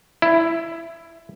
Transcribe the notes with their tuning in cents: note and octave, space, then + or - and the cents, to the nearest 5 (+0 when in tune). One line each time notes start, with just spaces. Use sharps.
E4 +10